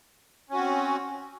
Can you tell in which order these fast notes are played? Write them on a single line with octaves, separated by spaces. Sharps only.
C#4 F#4 C4